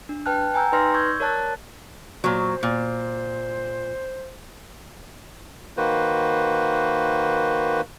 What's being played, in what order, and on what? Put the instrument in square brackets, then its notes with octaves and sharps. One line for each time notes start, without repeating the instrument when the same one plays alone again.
[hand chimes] D4
B4 G5 A5 F6 F#6
G5 G#5 A#5 E6 G6
D#4 B4 D5 C6 F6 A#6
C#6 E6 G6 G#6
A#4 C#5 D5 A5 F#6 A6
[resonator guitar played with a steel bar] A#2 F#3 [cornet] C5
[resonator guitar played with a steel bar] A#2
[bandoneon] D#3 A#3 F#4 B4 C5